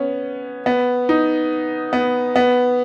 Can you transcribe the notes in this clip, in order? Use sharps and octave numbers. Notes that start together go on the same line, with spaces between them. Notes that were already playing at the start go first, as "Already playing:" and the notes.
Already playing: B3 C#4
B3
D#4
B3
B3